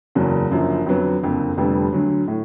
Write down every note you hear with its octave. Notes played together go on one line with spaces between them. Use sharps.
F#1 E2 C#3 F#3
F#1 F#2 D3 F3
F2 D3 F#3 B3
F#1 F2 D3
F1 F2 D3 G3 B3
D2 D3 F#3
A2